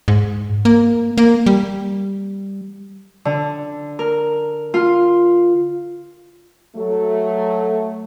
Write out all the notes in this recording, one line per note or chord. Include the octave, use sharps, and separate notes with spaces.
G#2
A#3
A#3
G3
D3
A#4
F4
F#3 A3